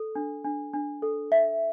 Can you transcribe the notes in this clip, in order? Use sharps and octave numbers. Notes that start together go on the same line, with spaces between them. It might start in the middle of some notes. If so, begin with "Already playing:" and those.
Already playing: A4
D4
D4
D4
A4
E5